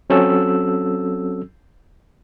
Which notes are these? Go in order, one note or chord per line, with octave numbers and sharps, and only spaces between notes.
F#3 C4 C#4 F#4 A4 E6